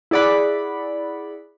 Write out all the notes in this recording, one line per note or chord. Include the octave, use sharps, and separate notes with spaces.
E4 G#4 D5 F#5 B5